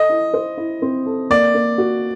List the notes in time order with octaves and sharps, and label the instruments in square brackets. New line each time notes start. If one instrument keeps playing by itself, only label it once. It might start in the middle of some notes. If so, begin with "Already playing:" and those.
Already playing: [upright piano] A4 [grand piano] D#5
[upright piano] E4
C5
E4
C4
A4
[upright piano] A#3 [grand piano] D5
[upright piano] A#3
F#4